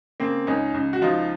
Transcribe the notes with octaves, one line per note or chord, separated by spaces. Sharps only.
C#3 A#3 C4
C#2 C#4 D#4
C#2
F#4
F3 D#4 F4